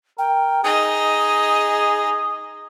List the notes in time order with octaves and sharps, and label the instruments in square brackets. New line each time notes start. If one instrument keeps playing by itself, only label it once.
[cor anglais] A#4 [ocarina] G5
[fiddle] D#4 D#5 [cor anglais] G#4 [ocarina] D#6